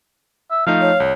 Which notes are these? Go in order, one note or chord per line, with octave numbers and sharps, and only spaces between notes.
E5
F3 A3 D#4 F5
C#5
C2